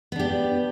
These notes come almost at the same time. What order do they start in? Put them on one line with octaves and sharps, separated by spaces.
B3 D4 G4